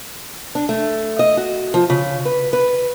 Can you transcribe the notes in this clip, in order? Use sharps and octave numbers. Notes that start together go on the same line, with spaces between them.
D4
A3
D#5
F#4
F3
C#3
B4
B4